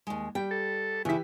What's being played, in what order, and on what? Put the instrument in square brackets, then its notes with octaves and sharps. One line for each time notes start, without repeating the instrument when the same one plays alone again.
[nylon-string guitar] D#2 G#3
[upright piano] G3 [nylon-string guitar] G5
[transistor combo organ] A4
[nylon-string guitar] C#3 E4 [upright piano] E3 G4 B6